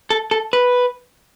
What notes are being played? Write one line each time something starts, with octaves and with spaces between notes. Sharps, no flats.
A4
A4
B4